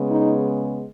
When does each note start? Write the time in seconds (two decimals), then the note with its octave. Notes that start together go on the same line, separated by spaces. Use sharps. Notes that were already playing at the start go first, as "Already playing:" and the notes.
Already playing: C#3 G#3 B3
0.10 D#4